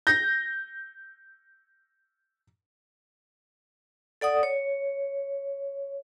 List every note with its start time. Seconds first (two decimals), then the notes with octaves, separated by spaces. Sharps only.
0.07 G6 A#6
4.21 A4 D5 F#5 D#6
4.43 C#5